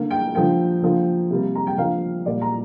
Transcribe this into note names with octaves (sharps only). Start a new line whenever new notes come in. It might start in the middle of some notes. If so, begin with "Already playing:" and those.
Already playing: D3 A#3
G5
D3 F3 A#3 G5
D3 F3 A#3
C3 G3 A#3
A#5
G5
D3 F3 A#3 F5
A#2 G3 A#3 D5
A#5